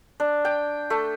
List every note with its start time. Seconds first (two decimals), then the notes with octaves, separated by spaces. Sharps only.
0.20 D4
0.45 G5
0.90 A3